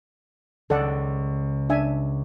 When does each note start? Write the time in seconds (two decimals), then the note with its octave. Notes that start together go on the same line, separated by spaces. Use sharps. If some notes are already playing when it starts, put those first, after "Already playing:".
0.70 C#2 A4 D5 F#5
1.70 D4 E5 G#5